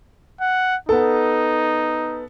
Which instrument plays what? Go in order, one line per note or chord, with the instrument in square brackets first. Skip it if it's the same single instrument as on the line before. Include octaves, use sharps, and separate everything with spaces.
[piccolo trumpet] F#5
[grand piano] B3 A4 [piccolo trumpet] D#4